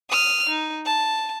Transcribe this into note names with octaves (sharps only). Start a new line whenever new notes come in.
D#6 F6
D#4
A5